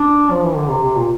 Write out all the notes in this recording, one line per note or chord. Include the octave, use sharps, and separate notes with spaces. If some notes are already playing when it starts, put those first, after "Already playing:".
Already playing: D4
F3
E3
D3
C3
C3
A#2